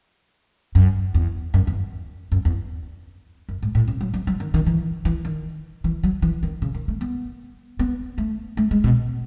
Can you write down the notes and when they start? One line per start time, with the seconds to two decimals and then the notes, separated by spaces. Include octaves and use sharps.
0.75 F#2
1.14 E2
1.54 F#2
1.67 E2
2.32 F#2
2.45 E2
3.49 F#2
3.62 G#2
3.75 A2
3.88 C#3
4.01 F#3
4.14 F#3
4.27 F#3
4.40 D#3
4.54 D#3
4.66 E3
5.05 E3
5.25 D#3
5.84 E3
6.03 F#3
6.22 E3
6.43 D#3
6.62 C#3
6.74 D#3
6.88 A3
7.01 B3
7.79 B3
8.18 A3
8.57 A3
8.71 G#3
8.84 B2